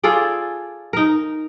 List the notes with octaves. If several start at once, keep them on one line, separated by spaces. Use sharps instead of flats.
F4 G#4 A4 D5
D#4 A#4